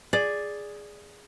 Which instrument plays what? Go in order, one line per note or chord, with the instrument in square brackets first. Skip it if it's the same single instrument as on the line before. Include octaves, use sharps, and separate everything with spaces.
[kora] G#4 [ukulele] D5